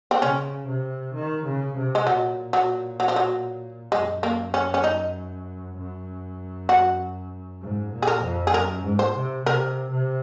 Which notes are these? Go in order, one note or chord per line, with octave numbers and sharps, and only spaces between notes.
C4
C#3 C#4
C3
D#3
C#3
C3
G#3
A#2 F#3
F#3
F#3
F3
F#3
F#2 G#3
A#3
C#4
C#4
D#4
F#2
F#4
G#2
A#2
G#4
A#4
F2
G#4
F#2 A#4
G#2
C5
C3
C3 A#4
C3